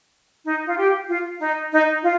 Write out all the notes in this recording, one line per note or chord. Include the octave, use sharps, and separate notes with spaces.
D#4
F4
G4
F4
D#4
D#4
F4